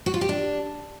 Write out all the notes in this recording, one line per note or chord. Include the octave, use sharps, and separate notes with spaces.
F#4
F4
G4
D4